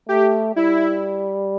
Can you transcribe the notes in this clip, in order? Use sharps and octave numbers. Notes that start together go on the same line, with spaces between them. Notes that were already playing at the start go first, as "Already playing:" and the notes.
A3 G4
G3 E4